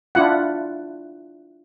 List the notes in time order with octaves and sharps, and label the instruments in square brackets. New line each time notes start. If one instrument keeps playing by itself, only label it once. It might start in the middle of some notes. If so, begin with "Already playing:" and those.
[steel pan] D4 E4 F4 F#5